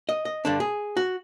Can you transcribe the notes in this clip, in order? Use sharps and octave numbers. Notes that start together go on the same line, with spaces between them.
D#5
D#5
G2 D3 D4
G#4
F#4